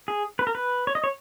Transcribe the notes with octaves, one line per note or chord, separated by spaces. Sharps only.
G#4
B4
A#4
B4
C#5
D#5
C#5